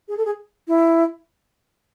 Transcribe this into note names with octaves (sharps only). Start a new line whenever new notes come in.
G#4
A4
G#4
E4